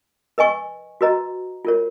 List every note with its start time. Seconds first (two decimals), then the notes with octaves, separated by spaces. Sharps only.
0.38 B4 D#5 G#5 C#6
1.01 F#4 B4 D#5 A#5
1.65 F4 A#4 C#5